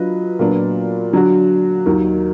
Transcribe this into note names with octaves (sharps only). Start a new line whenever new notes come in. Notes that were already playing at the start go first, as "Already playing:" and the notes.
Already playing: F#3 D4 F4 B4 D#5
A#2 F#3 B3 D4
D3 F#3 D4 F#4
D#2 D#3 F#3